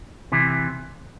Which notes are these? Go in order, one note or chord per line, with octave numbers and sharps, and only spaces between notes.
C3 E3